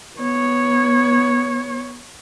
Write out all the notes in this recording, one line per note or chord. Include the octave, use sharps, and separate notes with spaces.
B3 C#5